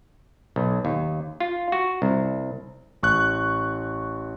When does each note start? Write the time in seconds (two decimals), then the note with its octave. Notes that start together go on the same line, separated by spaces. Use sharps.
0.56 B1
0.85 D#2
1.40 F4
1.72 F#4
2.02 C2
3.03 A1 C#6 F#6